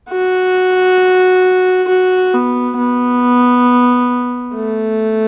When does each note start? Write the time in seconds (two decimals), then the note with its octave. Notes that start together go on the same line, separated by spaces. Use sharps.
0.11 F#4
1.88 F#4
2.34 B3
2.78 B3
4.56 A3